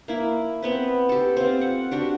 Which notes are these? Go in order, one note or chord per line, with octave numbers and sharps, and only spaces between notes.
A#3 E4
B3 C4 B4
G4 A4
C4 F4
F#5
D4 F#4 G4